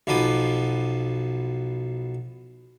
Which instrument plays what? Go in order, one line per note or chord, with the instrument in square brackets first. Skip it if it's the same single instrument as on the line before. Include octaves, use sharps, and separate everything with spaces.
[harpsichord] B1 B2 F3 B4 G#5 D6